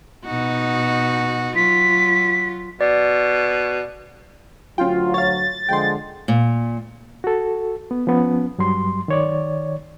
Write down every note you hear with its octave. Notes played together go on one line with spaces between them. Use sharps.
B2 D#4 F#4
F#3 F4 B6
B2 D5
D2 F#3 C#4 F4 G5
C#5 F5 A6
D3 F3 G#3 G5 C6
A#2
F#4 A4
B3
F3 B3 C#4
G2 F#3 G3 C6
D#3 C#5 D5